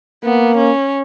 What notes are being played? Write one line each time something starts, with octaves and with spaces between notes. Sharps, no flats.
A#3 B3
C#4